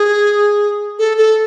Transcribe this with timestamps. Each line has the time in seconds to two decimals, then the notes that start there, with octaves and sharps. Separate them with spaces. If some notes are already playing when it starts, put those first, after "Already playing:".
Already playing: G#4
0.99 A4
1.17 A4